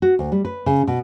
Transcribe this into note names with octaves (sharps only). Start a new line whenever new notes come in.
F#4
D2
G3
B4
C#3
B2